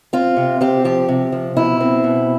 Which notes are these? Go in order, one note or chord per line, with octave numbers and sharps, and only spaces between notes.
C4 F4
C3
C4 G4
F3 G4
C3
F3
B2 E4
C4
B2